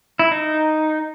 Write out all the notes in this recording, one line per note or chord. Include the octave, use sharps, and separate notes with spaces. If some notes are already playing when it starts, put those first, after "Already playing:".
E4
D#4